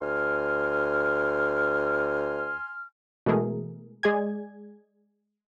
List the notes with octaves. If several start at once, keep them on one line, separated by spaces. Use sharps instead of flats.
D2 G#5 C6 F6
B2 E3 G#3 A3 G#4 A#4
G#3 G#4 D5 G#5 G#6